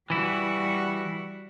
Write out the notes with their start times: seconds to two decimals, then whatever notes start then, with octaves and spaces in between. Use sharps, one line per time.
0.10 E3 G3 E4 F#4